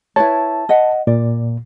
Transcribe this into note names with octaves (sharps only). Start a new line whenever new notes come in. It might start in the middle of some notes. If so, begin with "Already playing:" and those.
E4 B4 C#5 A5
D#5 F#5
A#2 D5